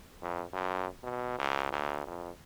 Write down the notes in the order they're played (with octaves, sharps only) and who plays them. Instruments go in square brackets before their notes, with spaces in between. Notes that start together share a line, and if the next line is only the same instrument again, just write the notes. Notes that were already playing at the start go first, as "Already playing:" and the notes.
[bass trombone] F2
F#2
B2
C#2
D2
F2